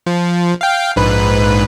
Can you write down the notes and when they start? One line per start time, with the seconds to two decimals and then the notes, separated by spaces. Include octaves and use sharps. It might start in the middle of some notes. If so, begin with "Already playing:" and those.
0.06 F3
0.61 F5 G5
0.96 A#1 G#2 B4